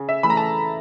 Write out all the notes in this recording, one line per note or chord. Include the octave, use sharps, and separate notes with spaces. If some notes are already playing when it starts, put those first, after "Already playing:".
Already playing: C#3
E5
E3 A3 B5
A#5
A5